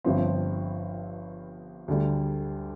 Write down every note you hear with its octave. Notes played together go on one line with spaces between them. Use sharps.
G1 G2 F3 C4
D2 D3 G3